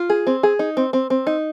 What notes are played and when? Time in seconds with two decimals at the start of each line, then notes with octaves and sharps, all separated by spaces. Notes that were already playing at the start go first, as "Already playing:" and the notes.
Already playing: F4
0.10 G#4
0.27 C4
0.43 G#4
0.59 D#4
0.77 C4
0.93 C4
1.10 C4
1.27 D#4